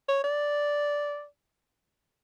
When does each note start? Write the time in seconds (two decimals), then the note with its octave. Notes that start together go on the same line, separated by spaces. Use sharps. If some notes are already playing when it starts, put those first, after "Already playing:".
0.09 C#5
0.24 D5